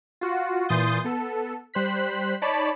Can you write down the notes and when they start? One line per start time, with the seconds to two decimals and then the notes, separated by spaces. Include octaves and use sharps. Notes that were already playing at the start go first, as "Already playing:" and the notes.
0.21 F4 F#4
0.69 A#2 E3 C6 D#6 G6 A6
1.04 B3 A4
1.74 G3 C5 F#6 B6
2.42 D#4 C#5 D5 A5 B5